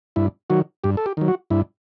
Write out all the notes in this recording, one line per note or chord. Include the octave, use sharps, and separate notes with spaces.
G2 E4
D#3 F#3 F#4
G2 G4
A4
G4
D#3 F#3
F#4
G2 E4